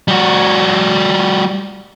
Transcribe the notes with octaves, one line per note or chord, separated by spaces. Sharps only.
G3 F#4